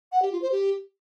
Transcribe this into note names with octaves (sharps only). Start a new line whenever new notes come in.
F#5
G4
F4
C5
G4